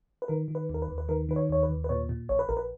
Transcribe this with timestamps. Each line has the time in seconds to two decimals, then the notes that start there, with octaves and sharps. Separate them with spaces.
0.22 B4
0.28 D#3 A#4
0.48 D#3
0.55 B4
0.69 D#2 A#4
0.82 B4
0.88 D#2
0.98 B4
1.09 D#3 A#4
1.29 D#3 B4
1.36 C#5
1.50 D#2 C#5
1.63 B4
1.70 D#2
1.84 B4
1.89 A#2 C#5
2.09 A#2
2.29 A#1 C#5
2.39 B4
2.49 A#1 A#4
2.57 B4